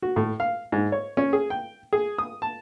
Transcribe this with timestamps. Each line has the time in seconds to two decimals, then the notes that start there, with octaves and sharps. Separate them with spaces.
0.02 F#4
0.16 A2
0.40 F5
0.72 G#2
0.92 C#5
1.17 C#4
1.33 G#4
1.50 G5
1.93 G#4
2.18 D#6
2.42 A5